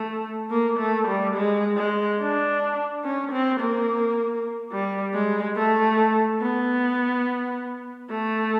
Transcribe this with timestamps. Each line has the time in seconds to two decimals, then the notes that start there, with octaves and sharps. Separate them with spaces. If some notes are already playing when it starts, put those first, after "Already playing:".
Already playing: A3
0.51 A#3
0.79 A3
1.08 G3
1.36 G#3
1.77 G#3
2.20 D4
3.04 C#4
3.32 C4
3.60 A#3
4.72 G3
5.14 G#3
5.56 A3
6.41 B3
8.10 A3